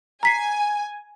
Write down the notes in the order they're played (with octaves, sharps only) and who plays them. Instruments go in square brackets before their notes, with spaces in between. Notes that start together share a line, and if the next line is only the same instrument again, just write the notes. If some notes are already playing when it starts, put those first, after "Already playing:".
[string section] G#5 [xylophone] A#5 B6 C7